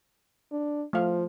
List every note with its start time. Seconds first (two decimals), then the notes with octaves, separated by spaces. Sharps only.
0.51 D4
0.93 F3 A3 F5